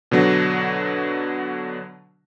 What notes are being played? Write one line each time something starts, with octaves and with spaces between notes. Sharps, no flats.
B2 D3 F#3